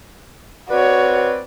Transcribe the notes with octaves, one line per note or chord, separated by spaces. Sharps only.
C4 F#4 B4 C#5 D5